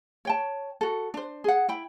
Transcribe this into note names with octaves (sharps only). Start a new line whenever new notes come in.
C#5 G5 A5
F#4 A4
D4 C5
G#4 F#5
E4 G5 B5